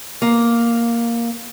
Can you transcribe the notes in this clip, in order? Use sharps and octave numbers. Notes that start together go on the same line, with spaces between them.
A#3